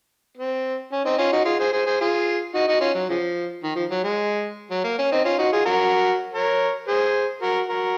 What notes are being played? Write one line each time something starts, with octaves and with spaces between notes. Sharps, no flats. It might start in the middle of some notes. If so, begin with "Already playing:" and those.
C4
C#4
C4 D#4
C#4 F4
D#4 F#4
F4 G#4
G#4 C5
G#4 C5
G#4 C5
F4 G#4
D#4 F#4
D#4 F#4
C#4 F4
F#3
C#3 F3
D#3
F3
F#3
G#3
F#3
A#3
C#4
C4 D#4
C#4 F4
D#4 F#4
F4 G#4
F#4 A#4
A#4 C#5
G#4 C5
F#4 A#4
F#4 A#4